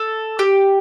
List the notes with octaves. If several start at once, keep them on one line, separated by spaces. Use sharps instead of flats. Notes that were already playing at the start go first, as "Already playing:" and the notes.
Already playing: A4
G4